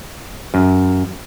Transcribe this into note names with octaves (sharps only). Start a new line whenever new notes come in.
F#2